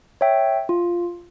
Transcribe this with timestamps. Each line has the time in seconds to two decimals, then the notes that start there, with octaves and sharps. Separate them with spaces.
0.21 C#5 E5 G5
0.69 F4